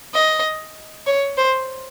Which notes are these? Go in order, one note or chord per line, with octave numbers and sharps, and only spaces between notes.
D#5
C#5
C5